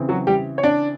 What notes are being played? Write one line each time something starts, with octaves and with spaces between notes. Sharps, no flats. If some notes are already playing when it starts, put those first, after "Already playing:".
Already playing: C#3 E3 C4
F#3 F#4
G3 G4
C#5
D4 D5